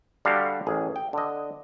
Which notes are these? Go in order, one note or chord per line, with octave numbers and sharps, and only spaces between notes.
D3 G3 F#4 G4 F5 G5
A1 G#4
G5
D3 D#5